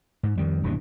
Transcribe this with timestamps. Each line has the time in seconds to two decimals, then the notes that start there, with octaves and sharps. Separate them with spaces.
0.23 G#2
0.37 F2 D#3 G3
0.63 D#1 G2 B2 E3